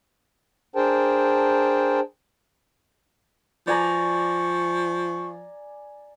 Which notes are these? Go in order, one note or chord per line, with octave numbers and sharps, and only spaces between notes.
D4 G#4 A#4 C5 G5 A5
F3 D5 G#5 A#5 C#6